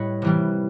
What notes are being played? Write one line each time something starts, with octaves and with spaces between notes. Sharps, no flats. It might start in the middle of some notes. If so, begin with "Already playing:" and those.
Already playing: A2 G3 B4 C#5 D#5
C3 E3 G3